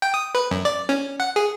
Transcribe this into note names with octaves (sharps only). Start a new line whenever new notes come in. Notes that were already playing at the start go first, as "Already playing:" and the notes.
G5
D#6
B4
F#2
D5
C#4
F#5
G#4